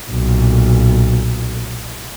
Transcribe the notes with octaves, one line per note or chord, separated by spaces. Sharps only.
B1 A#2